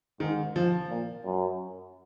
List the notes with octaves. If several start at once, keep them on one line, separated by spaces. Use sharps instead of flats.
G#2 D#3
F3
A#2
F#2